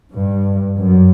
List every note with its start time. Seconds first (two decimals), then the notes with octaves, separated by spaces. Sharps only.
0.15 G2
0.77 F#2